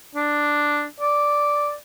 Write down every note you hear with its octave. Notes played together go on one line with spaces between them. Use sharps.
D4
D5